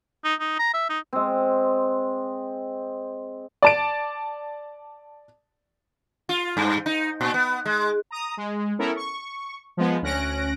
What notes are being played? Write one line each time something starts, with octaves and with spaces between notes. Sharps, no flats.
D#4
D#4
A#5
E5
D#4
G#3 C4
D5 A5 D7
F4
G2
D#4
A#2
B3
G#3
A#5 D#6
G#3
B3 C#4 E4 A4 A#4
C#6
F3 G#3 B3
D2 C#4 F#6 A#6 D7